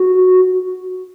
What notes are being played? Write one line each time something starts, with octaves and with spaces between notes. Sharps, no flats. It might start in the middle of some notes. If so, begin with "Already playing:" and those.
Already playing: F#4